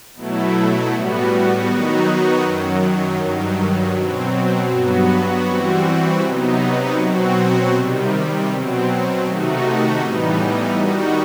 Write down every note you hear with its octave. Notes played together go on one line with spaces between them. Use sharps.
B2 F#3 A3 E4
A2 G3 B3 F#4
D#3 F#3 B3 D#4 F#4
F#2 D#3 F#3
G2 D#3 F#3
B2 F#3 C4
G2 F#3 B3 F#4
E3 G3 C4 F#4
C3 F#3 B3 D#4
B2 F#3 C4 F#4
C3 D#3 G3
B2 F#3 C4
C3 D#3 A3 D#4 F#4
A2 E3 G3 B3 D#4
D#3 G3 D#4 F#4